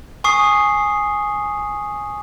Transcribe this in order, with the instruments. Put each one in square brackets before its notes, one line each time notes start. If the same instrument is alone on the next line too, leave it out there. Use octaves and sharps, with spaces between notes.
[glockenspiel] G#5 C#6 D#6 C7